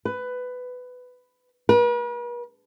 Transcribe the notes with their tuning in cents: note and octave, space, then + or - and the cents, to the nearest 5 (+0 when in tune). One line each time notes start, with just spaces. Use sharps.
B4 +15
B4 -45